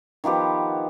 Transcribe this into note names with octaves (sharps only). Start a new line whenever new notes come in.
D#3 F3 B3 G4